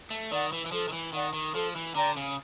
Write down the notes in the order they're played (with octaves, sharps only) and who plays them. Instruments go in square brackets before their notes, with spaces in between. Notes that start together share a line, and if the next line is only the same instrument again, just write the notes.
[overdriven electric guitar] A3
[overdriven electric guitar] D#3 [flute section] D5 F#5
[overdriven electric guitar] E3
E3
[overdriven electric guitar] F3 [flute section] A4
[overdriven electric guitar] D#3
E3
[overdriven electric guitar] D#3 [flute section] D5 F#5
[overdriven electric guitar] D#3
[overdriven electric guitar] F3 [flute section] A4
[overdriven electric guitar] E3
[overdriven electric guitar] D3 [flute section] D5 G5 A#5
[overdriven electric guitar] C#3